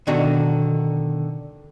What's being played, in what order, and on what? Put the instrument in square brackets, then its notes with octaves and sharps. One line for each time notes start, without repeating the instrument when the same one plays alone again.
[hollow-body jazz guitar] B2 D3 D#3 D4 F#4